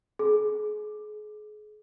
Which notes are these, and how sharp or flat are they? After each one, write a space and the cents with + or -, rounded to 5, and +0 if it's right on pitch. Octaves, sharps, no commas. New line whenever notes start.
G#4 +35